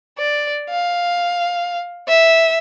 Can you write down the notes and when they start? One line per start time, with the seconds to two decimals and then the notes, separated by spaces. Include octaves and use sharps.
0.18 D5
0.70 F5
2.08 E5